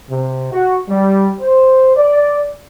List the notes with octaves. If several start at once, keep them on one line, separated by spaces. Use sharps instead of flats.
C3
F#4
G3
C5
D5